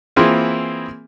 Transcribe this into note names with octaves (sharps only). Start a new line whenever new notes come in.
E3 A#3 C4 E4 F4 G#4